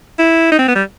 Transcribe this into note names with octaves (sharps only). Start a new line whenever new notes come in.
E4
D#4
C4
B3
G3